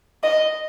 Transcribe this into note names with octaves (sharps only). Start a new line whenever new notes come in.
D#5